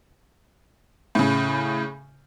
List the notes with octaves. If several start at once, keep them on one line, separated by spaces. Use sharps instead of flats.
A2 C#3